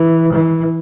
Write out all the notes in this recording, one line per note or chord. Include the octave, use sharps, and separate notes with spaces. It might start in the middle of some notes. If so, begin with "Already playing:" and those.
Already playing: E3
E3